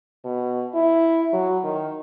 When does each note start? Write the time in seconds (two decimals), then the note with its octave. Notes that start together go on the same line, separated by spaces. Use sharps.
0.25 B2
0.74 E4
1.33 F#3
1.64 D#3